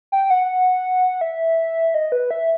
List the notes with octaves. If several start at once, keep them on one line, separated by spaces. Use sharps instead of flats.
G5
F#5
E5
D#5
B4
E5